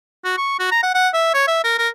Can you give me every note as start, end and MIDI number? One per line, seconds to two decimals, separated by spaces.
0.25 0.37 66
0.37 0.58 85
0.60 0.68 66
0.71 0.81 82
0.83 0.91 78
0.95 1.08 78
1.14 1.29 76
1.34 1.46 73
1.48 1.61 76
1.64 1.74 70
1.79 1.89 70